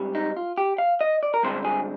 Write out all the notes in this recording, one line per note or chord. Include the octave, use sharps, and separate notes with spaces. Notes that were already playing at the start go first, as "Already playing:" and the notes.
Already playing: G#2 G3 C4
D#4
F4
G4
F5
D#5
D5
A#4
G2 D3 G#3 C4 C5
G#4